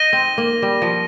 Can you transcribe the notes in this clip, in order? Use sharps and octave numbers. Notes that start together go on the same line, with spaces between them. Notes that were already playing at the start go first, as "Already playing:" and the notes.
Already playing: D#4 A#6 D#7 G7
C4
A#3
G3
F3